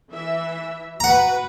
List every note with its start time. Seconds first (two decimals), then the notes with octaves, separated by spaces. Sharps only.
0.12 E3 E5
1.00 F#4 B4 F#5 A#5